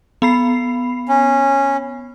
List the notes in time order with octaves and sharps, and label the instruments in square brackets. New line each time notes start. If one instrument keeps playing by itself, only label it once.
[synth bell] B3 B5 C7
[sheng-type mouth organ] C#4